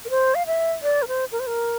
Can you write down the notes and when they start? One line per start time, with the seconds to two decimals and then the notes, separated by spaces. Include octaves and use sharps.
0.05 A#4
0.10 C5
0.35 F5
0.47 E5
0.83 D5
1.02 A#4
1.08 C5
1.32 A#4
1.40 C5
1.47 A#4